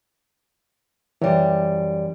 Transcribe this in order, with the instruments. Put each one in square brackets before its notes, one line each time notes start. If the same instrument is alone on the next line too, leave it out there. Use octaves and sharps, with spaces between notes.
[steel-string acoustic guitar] F#2 G3 [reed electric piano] E3